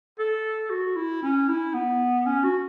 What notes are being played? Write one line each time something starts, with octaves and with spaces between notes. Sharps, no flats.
A4
F#4
E4
C#4
E4
B3
C#4
F#4